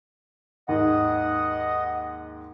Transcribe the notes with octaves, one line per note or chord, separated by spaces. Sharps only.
D#2 G#2 D#5 F#5